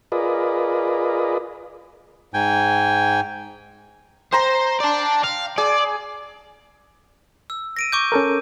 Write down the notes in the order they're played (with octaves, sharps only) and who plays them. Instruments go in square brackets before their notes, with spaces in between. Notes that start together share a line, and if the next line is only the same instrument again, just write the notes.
[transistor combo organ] F4 G#4 A#4 B4 D5 D#5
[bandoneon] G#2 G5 G#5
[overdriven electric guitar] C5 [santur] G5 A#5 C6
[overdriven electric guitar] D5 A5
F5
[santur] G#4 [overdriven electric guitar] D5
[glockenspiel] E6
A#6 D7 D#7
C#6 D6 G6
[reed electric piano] C#4 A4 A#4